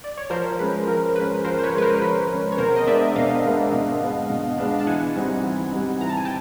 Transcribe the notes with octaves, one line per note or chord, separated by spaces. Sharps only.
D5
C#5
F3 A#4 C5
G#3 C#4 B4
F3 A#4
G#3 C#4 B4
F3 A#4 C5
C5
B4 C#5
G#3 C#4 B4
A#4 C5
F3 B4
G#3 C#4
C#5
B2 A#4 C5
D#5
G#3 B3 D4 D5 E5
B2 D#5 F5
G#3 B3 D4
B2
G#3 B3 D4
B2
G#3 B3 D4
A5
E3 F#5 G#5
G3 C4 D#4
E3
G3 C4 D#4
E3 A#5
A5
G#5
G5 A5